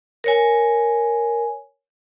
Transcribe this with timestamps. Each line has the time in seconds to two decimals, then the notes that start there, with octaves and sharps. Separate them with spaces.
0.24 A#4 C#5 G#5